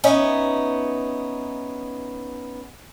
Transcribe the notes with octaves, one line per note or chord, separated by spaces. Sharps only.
B3 C#4 D#4 E5